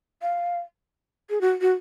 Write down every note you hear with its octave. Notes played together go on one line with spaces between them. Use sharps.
F5
G#4
F#4
F#4